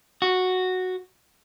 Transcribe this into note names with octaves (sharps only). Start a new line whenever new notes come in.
F#4